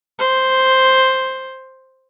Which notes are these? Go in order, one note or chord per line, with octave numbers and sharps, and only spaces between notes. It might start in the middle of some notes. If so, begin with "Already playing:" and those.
C5